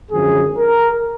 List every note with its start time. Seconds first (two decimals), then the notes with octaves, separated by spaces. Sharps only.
0.11 G#1 F#2 D3 F3 G#4
0.57 A#4